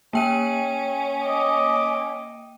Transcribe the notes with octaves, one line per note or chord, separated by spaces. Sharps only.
A#3 C#4 G5 D#7
D#5 D6